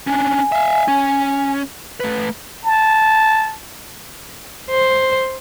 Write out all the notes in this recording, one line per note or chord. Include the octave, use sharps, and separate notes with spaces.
C#4 D4 G#5
E5 F5
C#4
A3 B4
A5
C5